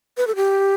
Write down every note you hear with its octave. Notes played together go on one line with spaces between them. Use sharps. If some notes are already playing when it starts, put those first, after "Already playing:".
B4
A4
G4